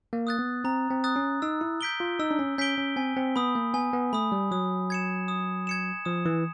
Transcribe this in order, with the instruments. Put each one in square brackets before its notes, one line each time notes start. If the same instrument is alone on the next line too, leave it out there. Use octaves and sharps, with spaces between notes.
[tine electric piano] A#3
[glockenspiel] D#6 F#6 A6
[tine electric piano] B3
[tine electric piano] C4 [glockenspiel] A#5
[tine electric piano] C4
[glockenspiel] D#6 F#6 A6
[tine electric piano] C#4
[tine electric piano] D#4 [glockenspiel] E6
[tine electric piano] E4
[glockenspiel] G6 B6 D7 G7
[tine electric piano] F4
[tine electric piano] D#4 [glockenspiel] E6
[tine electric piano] D4
C#4
[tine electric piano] C#4 [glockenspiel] G6 B6 D7 G7
[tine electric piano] C#4
[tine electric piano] C4 [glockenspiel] G#5
[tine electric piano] C4
[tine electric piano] B3 [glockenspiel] B5 D#6
[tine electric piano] A#3
[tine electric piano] B3 [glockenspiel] G#5
[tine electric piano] B3
[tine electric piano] A3 [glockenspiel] B5 D#6
[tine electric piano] G3
[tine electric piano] F#3 [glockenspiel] D#6
[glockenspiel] G#6 C#7 E7
D#6
G#6 C#7 E7
[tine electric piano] F3 [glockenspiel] D#6
[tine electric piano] E3